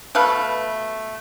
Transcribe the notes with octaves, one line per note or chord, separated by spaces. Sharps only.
B2 A3 B4 F5